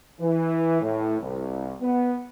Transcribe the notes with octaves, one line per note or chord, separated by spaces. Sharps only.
E3
A2
C2
B3